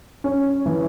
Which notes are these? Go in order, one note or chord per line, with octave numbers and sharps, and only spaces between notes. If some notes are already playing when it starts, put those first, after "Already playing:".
C#4
E3